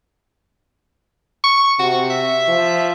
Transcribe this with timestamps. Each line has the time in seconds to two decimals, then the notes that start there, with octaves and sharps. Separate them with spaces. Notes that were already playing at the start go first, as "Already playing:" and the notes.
1.44 C#6
1.79 C3 F#4
2.10 E5
2.48 F3